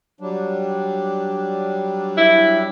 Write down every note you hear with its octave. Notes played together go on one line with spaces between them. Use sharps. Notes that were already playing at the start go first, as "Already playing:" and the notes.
F#3 G3 D4
E4